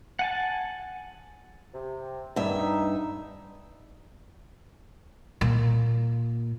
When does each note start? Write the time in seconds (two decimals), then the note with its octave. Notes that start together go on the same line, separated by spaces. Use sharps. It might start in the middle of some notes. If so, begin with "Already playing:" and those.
0.19 F#5 G#5 A5
1.73 C3
2.36 E2 G2 D#3 E5
2.58 D#4
5.41 A#2